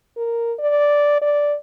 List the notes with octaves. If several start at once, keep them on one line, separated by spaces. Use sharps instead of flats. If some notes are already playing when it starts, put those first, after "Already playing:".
A#4
D5
D5